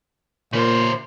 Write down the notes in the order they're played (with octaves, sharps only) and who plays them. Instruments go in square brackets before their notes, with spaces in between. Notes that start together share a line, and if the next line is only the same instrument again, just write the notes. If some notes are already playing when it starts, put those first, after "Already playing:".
[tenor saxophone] A#2 [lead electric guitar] C#3 C5